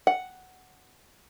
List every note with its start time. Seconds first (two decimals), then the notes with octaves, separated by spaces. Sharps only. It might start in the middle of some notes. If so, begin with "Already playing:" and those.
0.07 F#5